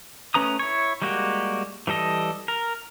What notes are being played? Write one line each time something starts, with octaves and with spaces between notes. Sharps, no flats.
A3 C#4 B4 A#5 D#6
E4 C#5
G3 G#3 A#3 F#4 G4
E3 G3 A4 D#5
A#4